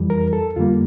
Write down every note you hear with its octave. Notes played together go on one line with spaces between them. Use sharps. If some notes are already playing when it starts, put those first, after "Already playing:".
Already playing: F2 E3 G3
A#4
A4
F2 D3 G3 A#3 F4